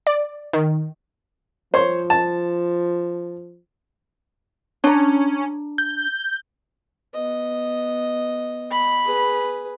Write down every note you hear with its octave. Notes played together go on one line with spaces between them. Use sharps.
D5
D#3
F3 C5 C#5 C6
A5
C#4 D4 A#5
G6
B3 D#5
B5
G#4 B4